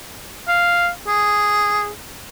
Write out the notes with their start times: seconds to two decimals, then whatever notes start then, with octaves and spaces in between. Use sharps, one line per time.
0.48 F5
1.07 G#4